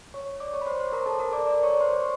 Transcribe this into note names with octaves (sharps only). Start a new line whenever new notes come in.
C#5 C#6
D5 D6
C#5 C#6
B5
C5 C6
C5 C6
A#4 A#5
A4 A5
A#4 A#5
D5 D6
D5 D6
C#5 C#6
C5 C6